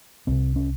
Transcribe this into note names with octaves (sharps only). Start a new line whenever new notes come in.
C2 C3 C4
C#4